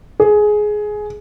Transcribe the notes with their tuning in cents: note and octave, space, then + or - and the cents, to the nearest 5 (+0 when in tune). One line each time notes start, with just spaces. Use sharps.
G#4 +15